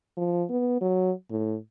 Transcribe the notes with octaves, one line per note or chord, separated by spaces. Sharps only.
F3
B3
F#3
A2